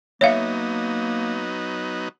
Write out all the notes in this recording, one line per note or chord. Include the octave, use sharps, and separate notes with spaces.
F#3 A#3 B3 D#4 C#5 E5 F5